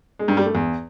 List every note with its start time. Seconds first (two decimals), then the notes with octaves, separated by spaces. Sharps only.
0.19 G#3
0.28 G2
0.37 G3
0.46 A3
0.55 E2